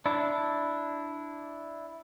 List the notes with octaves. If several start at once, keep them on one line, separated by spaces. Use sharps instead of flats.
D4 E4